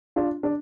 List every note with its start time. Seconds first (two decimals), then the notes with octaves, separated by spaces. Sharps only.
0.16 D4 F4
0.43 D4